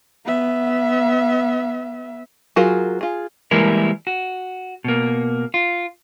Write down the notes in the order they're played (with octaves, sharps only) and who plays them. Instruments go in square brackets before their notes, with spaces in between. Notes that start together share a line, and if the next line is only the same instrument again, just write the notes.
[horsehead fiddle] B3 E5
[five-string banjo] F#3 F4 F#4 G#4 A#4
F4 G#4
[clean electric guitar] E3 G3 G#3 A#3 E4 A#4
F#4
B2 A#3
F4